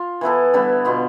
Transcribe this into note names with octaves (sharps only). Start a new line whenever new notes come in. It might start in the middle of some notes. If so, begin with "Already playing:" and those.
Already playing: F4
E3 B3 E4 A4
D3 G3 B3 E4
B2 B3 F4